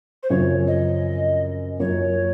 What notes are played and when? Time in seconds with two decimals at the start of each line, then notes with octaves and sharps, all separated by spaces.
0.23 C5
0.30 F#2 C#3 F3 C4 C#5
0.67 D#5
1.80 F#2 F3 A#3 C#5